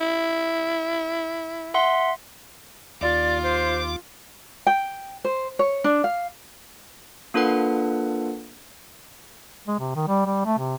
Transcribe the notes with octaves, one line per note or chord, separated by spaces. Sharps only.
E4
E5 F#5 C6
D#2 F4 D5 D6
C5
G5
C5
C#5
D4
F5
A#3 D4 F4 A4 B4 F#5
G#3
C3
D#3
G3
G3
A3
C3